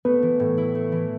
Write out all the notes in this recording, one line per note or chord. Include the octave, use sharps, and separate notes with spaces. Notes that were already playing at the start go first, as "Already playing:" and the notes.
A3 B3 B4
E3
A2
E4
A3
E3